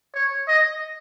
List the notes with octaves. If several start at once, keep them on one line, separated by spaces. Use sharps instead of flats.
C#5
D#5